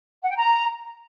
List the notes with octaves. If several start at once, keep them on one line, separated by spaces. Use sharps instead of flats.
F#5
G5
A#5